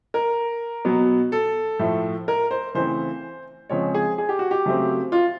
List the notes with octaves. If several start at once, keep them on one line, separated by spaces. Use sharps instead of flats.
A#4
B2 F#3 B3
A4
A2 F3 A3
A#4
C5
C#3 E3 A3 C4 C5
C#3 F3 G#3 C4 C#5
G#4
G#4
G4
F#4
G4
C#3 F#3 A3 C4
F4